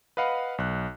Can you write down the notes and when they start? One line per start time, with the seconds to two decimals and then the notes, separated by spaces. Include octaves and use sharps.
0.17 B4 D#5 F5 F#5 B5
0.58 B1 F#6